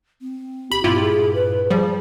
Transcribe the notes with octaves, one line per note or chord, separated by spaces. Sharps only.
C4
G1 G4 B5
G2 A#2 C4 E4 F4 G4
G#4
B4
F3 G3 G#4